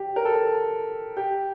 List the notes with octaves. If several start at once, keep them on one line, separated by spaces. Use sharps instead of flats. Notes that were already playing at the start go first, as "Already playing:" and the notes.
Already playing: G4
A#4
A4
G4